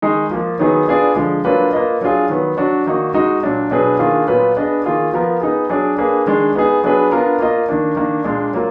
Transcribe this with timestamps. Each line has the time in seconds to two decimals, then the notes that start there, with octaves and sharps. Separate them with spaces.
0.02 D#3 G#3 D#4 G#4
0.31 F3 A#3 F4
0.59 D#3 F#3 B3 D#4 G#4
0.88 B3 D4 F4 G#4 D5
1.16 D3 F3 G#3
1.45 F#3 A#3 D4 F4 B4
1.73 A#3 F4 B4 D#5
2.01 F#3 D4 F4 G#4
2.30 D#3 F#3 B3
2.57 F#3 D4 F#4
2.87 D#3 A#3 D#4 F#4
3.14 G#3 D#4 F#4
3.43 A#2 F#3 D4
3.71 B2 F#3 D4 G#4 B4
3.99 D#3 A#3 D4 F4 G#4
4.28 A#2 F#3 B3 F4 B4
4.57 B3 D4 G#4 D#5
4.84 D#3 A#3 F4 G#4
5.13 F3 B3 F4 A#4
5.41 B3 D#4 G#4
5.69 F#3 D4 G#4 D5
5.98 A#3 D4 G#4 B4
6.26 D#3 G#3 D4 G#4
6.55 B3 D#4 G#4
6.83 F#3 B3 D4 G#4 B4
7.12 B3 D4 F4 A#4
7.40 A#3 F4 A#4 D#5
7.69 D#3 A#3 D4
7.96 D#3 A#3 D4
8.24 A#2 G#3 D4
8.53 F#3 A#3 F4 A#4